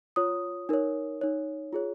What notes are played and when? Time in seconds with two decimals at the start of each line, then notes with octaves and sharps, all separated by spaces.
0.16 F4 C#5 D#6
0.69 D#4 A#4 C#5
1.21 D#4 C#5
1.73 F4 G#4 C#5